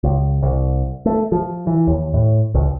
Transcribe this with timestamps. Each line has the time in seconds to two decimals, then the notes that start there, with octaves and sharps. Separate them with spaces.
0.04 C#2
0.43 C2
1.06 A3
1.32 F3
1.67 E3
1.87 D#2
2.14 A2
2.54 C#2